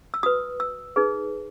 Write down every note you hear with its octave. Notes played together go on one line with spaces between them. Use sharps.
E6
F#4 B4 D#6
E6
D#4 G#4 B4